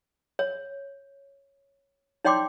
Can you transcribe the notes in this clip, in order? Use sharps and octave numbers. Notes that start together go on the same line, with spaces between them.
C#5
D#4 C#5 D5 G5 C6 D6